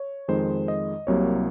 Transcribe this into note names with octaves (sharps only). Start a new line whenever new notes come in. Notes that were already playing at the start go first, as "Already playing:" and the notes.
Already playing: C#5
F2 D#3 G#3 C5
D#5
C2 C3 F#3 A#3 C#5